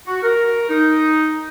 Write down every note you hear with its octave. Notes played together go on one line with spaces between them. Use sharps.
F#4
A#4
D#4